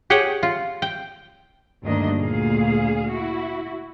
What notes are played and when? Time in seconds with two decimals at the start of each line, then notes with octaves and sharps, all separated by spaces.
0.10 G4 G#4 C#5 F#5 G5
0.43 F4
0.82 G5
1.83 D2 G2 D#3 A#3 D4 D#5
2.18 D2 A#2 G#4 F5
3.10 E4 F#4